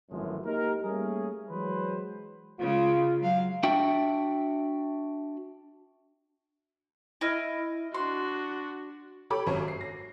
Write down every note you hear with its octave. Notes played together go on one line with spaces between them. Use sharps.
G#1 F#2 A2 E3 F3 G#3
A#3 D#4 G4 A#4
G3 A3 A#3 C#4 G#4
E3 F#3 G#3 G#4 B4 C5
C#3 G#3 F4
F#3 F5
D4 F#4 E5 G5
E4 D#5 F6
D4 F#4 C6
G4 A4 C#5 B5 D6
G#1 F#2 C#5
C7
A#6